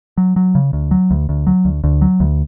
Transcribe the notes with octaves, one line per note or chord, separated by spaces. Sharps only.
F#3
F#3
C#3
D2
F#3
D2
D2
F#3
D2
D2
F#3
D2